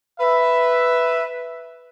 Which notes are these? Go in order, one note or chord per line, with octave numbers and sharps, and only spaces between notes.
B4 E5